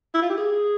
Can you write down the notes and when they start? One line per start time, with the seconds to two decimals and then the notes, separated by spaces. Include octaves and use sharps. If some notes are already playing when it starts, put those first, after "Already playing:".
0.14 E4
0.22 F4
0.30 G4
0.37 G#4